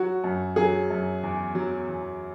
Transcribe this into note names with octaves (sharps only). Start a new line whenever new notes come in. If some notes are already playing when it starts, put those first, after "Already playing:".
Already playing: F#3 F#4
F#2
F#3 G#4
F#2
E2
F#3
E2